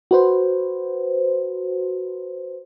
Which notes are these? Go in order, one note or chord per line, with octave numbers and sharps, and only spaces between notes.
F#4 B4 C5